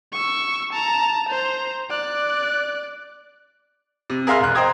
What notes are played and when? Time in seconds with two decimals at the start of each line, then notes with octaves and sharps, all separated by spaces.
0.13 C#6 E6
0.73 A5 A#5
1.29 C5 A#5
1.90 D5 F#6
4.10 C3
4.27 G#4 A#4 E5 F5 C6 F6
4.41 E1 F#6
4.55 C5 D#5 G5 A#5 D#6 G#6